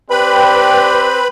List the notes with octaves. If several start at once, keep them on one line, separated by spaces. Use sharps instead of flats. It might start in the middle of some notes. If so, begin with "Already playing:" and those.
C4 G4 B4 D5 G5 B5